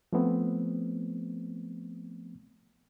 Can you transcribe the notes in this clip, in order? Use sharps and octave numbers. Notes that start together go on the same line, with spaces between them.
F3 A3 B3 C4